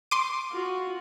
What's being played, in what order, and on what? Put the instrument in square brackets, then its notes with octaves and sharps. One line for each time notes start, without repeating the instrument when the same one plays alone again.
[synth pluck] C6 D6 D#7
[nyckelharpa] F4 F#4